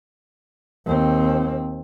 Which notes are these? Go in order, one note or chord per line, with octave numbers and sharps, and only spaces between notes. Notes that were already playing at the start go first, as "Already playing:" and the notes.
D#2 C4